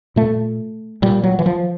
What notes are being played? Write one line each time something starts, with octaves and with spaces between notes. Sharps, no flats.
A#2 A3
A#2 G3
F#3
E3
F3